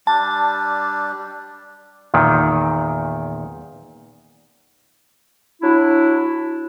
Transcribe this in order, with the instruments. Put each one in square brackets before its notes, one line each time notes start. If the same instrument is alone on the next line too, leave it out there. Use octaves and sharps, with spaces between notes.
[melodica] G3 D4 [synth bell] A5
[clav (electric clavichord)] E2 A#2 D#3
[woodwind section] F#3 D4 E4